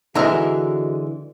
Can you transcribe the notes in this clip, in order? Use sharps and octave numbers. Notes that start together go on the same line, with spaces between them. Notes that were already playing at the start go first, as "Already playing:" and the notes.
D3 E3 G#3 F#4 A#4 E5 A#5